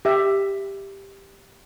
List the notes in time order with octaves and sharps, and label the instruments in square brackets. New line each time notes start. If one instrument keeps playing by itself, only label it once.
[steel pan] G4 E5